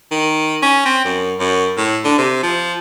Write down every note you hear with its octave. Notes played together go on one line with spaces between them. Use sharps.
D#3
C#4
C4
F#2
F#2
A2
D3
C3
F3